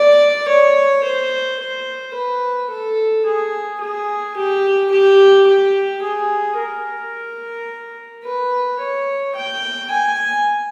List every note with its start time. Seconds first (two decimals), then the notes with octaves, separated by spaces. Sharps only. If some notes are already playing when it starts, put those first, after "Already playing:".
Already playing: D5
0.48 C#5
1.03 C5
1.59 C5
2.14 B4
2.70 A4
3.26 G#4
3.80 G#4
4.36 G4
4.91 G4
5.47 G4
6.02 G#4
6.58 A#4
8.24 B4
8.79 C#5
9.35 G5
9.91 G#5